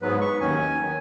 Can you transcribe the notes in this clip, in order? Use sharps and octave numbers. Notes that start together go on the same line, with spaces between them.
G#2 F#3 B3 B4
C#6
D#2 D#3 F#3 C#4 G#5
D#3 F#3